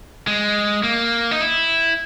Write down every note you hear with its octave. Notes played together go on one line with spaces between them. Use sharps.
G#3
A#3
D#4
E4